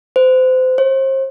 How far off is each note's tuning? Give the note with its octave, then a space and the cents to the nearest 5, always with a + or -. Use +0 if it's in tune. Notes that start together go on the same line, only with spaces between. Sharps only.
C5 -30
C5 +35